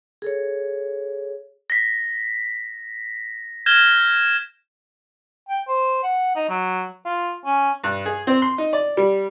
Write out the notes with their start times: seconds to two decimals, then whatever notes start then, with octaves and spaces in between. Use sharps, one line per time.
0.22 G#4 A4 C#5
1.70 A#6 B6
3.66 F6 G6 G#6 A#6 E7 G7
5.49 G5
5.68 C5
6.03 F#5
6.36 D#4
6.49 F#3
7.05 F4
7.45 C#4
7.84 G2
8.06 G#4
8.27 C4
8.42 C6
8.58 D#4
8.73 D5
8.97 G3